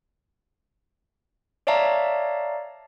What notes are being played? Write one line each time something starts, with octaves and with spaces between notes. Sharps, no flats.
C#5 D5 E5 F5 A5 A#5